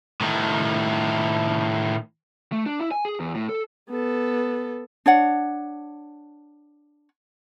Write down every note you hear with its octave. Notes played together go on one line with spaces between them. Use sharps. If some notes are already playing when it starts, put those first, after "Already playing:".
A2 D#3
A3
D4
E4
G#5
G#4
E2
A2
A4
B3 A4
D4 C#5 F#5